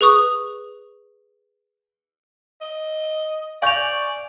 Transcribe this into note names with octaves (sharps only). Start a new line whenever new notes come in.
G#4 B4 C#6 D#6
D#5
D5 F5 G#5 C#6 G6 F7